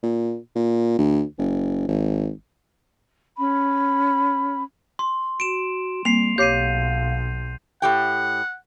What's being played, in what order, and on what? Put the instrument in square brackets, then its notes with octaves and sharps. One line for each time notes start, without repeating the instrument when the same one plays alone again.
[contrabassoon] A#2
A#2
D2
F#1
G#1
[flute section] C#4 B5
[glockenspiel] C6
[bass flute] F#4 [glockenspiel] D7 E7
[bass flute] G3 [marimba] A#3 C4 [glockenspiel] C7 F7
[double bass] B1 [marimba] G4 C#5 D6 [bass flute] F5 [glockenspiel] G6 C7 D#7
[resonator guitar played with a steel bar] A2 G4 G5 [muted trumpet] F#5